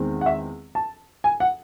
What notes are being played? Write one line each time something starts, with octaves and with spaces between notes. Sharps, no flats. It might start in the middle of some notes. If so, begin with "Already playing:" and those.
Already playing: E2 D#3 G#3 C4
F#5
E5
A5
G#5
F#5